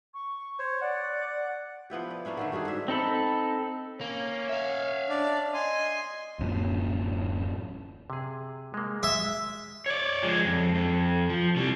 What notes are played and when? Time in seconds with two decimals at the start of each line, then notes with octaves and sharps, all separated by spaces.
0.14 C#6
0.59 C5 C#5
0.81 D5 F#5
1.90 F3 B3 E4 G4
2.10 D5
2.25 A#3 C#4 D4 E4
2.37 D3 D#3 A3
2.52 G2 D4 F#4 G#4
2.65 G#2 E5
2.88 C4 D#4 A4 B5
4.01 A#3 C#4
4.49 E5 F5
5.09 D4 D5
5.54 D#5 G#5 C6
6.39 D1 F#2 A#2
8.10 C3 G#4
8.74 G#3 A#3
9.03 G#3 E5
9.86 C#5 D5
10.23 F3 G#3
10.45 F2
10.75 F2
11.30 F3
11.56 C3 G3